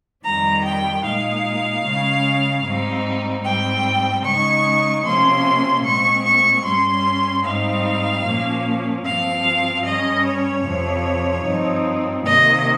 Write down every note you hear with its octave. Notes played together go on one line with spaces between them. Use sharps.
F2 D#3 G3 A#5
G5
A#2 G#3 D#4 F5
C#3 G#3 C#4
G#2 G3 C4 D#4
G#2 G3 C4 G5
C#3 G#3 D#4 C#6
C3 F3 A#3 C#4 C6
A#2 G#3 C4 C#6
C#6
G2 G3 C#4 C6
G#2 G3 C4 D#4 F5
A#2 F3 A#3 C#4
G2 F3 C4 F5
G2 G3 C#4 D#5
C#5
F2 C3 F3
G2 F3 C4 D#4
C3 D#3 A#3 D#5